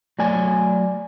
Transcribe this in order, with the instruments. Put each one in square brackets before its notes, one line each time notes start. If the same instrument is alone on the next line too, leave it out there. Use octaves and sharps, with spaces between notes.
[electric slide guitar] F#3 A3 D5 G#5